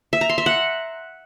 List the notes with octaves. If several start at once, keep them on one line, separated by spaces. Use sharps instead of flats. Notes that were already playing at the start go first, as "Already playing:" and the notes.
E5
A#5
C6
E5
F#5